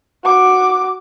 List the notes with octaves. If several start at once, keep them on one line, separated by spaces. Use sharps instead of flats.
F#4 D6